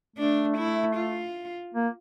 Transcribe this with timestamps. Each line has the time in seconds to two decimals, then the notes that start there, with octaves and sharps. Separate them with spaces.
0.16 A3 D4
0.57 E4
0.95 F4
1.74 A#3